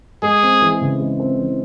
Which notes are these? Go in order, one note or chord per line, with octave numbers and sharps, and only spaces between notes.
G#3 G#4
C4
E3
C#3
G#3
C4
E3